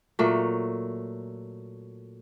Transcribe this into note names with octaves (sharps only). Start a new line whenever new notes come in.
A#2 F#3 A3